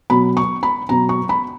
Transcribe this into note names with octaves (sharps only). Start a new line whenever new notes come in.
B2 F#3 B3 B5
C#6
B5
B2 F#3 B3 A#5
C#6
B5